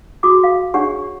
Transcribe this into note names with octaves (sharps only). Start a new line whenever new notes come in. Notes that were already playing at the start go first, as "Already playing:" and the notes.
F#4 G#4 D6 D#6
F5
D4 G#4 C#5 F#5 C#6